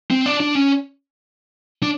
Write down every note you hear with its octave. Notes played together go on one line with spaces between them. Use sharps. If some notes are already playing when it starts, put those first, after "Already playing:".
C4
D4
D4
C#4
D4